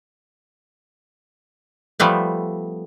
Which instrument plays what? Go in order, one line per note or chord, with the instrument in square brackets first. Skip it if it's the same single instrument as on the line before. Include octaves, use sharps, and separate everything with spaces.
[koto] F3 G3 A3 B3